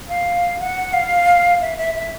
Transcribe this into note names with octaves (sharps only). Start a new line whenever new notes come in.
F5
F#5
F5
E5
E5
E5